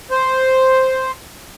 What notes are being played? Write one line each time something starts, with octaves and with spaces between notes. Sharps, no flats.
C5